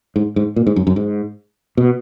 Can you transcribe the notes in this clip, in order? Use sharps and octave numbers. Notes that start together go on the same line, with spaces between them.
G#2
G#2
A#2
G#2
F#2
F#2
G#2
B2